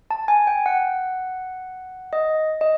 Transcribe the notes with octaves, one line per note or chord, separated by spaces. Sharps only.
A5
G#5
G5
F#5
D#5
D#5